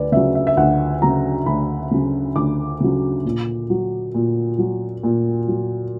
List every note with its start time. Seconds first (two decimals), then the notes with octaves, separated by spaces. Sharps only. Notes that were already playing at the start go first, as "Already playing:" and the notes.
Already playing: D2 B4 D5
0.12 C#3 F#3 E5
0.35 E5
0.47 E5
0.57 D2 F#5
1.02 C#3 F#3 A#5
1.46 D2 B5
1.91 C#3 F#3
2.36 D2 D6
2.80 C#3 F#3
3.25 A#2
3.70 F#3
4.14 A#2
4.58 F#3
5.03 A#2
5.48 F#3